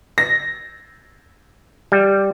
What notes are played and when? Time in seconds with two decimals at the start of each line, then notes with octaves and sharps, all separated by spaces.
0.18 A#6
1.92 G3